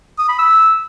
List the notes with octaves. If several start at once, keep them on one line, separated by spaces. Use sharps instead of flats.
D#6
B5
E6